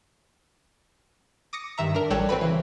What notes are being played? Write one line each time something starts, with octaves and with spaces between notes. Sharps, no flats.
D6 D#6 A#6 C#7
G2 D#3 E5 A#5
D4 A#4
A1 G3 A4 C#5 G5 F#6
C4 F#4 B4 B5
C#3 E3